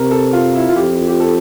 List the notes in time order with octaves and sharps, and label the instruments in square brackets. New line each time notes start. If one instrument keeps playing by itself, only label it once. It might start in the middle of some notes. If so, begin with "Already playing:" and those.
Already playing: [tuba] C3 [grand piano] A#4
[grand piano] A4
F4
E4
F4
[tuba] F2 [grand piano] G4
[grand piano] G4
A4